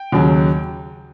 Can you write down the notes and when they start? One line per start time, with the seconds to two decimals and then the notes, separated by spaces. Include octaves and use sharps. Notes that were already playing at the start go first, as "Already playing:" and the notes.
Already playing: G5
0.12 D#2 C#3 F#3